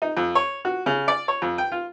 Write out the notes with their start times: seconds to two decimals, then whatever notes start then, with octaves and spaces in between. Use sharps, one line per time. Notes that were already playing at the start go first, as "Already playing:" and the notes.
0.02 D#4
0.17 F2
0.35 C#5
0.65 F#4
0.86 C#3
1.08 D5
1.28 C#5
1.42 F2
1.58 G5
1.72 F4